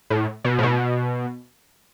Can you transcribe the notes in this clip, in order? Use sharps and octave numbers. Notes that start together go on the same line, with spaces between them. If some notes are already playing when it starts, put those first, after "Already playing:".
A2
B2
A2
B2